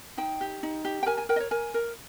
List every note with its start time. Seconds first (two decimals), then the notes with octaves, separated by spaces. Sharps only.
0.17 D#4 G5
0.41 G4
0.63 D#4
0.85 G4
1.03 G5
1.06 A#4 G#5
1.17 G#5
1.29 A#4 G5
1.36 D#5
1.40 C#5
1.51 A#4 G#5
1.74 A#4